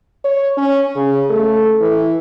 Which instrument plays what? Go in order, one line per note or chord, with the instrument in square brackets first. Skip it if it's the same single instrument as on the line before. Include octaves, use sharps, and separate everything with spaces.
[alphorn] C#5
C#4
C#3
A3
E3